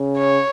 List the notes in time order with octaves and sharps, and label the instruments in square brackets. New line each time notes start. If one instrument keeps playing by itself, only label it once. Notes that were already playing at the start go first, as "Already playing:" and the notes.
Already playing: [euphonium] C#3
[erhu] C#5